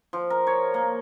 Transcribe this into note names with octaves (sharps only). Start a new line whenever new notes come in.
F3
A#4
C#5
A#3